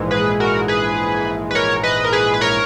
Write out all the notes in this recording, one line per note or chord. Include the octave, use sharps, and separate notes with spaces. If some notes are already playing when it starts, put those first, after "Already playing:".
Already playing: A#1 G#2 E3 G#3
G#4 B4
F#4 A#4
G#4 B4
B4
A#4 C#5
B4 D#5
A#4
G#4 B4
B4
A#4 C#5